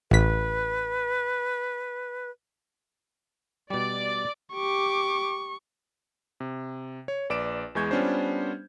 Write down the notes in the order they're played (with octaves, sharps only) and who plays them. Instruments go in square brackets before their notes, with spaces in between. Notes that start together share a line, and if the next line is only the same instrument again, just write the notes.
[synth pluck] A1 B6 [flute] B4
[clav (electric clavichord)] B2 G3 [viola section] D5
[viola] G4 D6 [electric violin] C#6
[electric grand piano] C3
C#5
A#1 B4 D5 D6 D7 E7
E2 E3 G#3 C#6 G6 G#6
G3 B3 C#4 D4 F4 C5